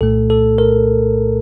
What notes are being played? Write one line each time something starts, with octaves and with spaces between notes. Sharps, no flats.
C2 A#2 A3 A4
A4
A#4